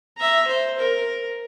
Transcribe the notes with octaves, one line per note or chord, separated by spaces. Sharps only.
E5 A#5
C5
A#4